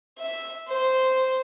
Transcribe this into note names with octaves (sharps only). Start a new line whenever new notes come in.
E5
C5